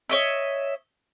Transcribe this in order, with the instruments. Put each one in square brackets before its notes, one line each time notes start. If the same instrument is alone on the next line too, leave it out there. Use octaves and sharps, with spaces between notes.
[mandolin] C#5 D#5 E5